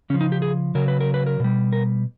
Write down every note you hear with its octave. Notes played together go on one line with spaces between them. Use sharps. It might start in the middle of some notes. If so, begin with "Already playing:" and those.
C#3 F3 C#4
D#4
G4
G#4
C#3 F#3 A#4
B4
A#4
B4
A#4
B2 G3
A#4